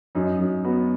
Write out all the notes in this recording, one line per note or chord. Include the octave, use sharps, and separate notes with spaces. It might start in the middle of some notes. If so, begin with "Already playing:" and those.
F#2 D#4
F#2
B3 F#4